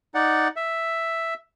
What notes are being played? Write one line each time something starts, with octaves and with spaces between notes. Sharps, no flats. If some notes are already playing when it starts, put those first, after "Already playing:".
D#4 D5 F#5
E5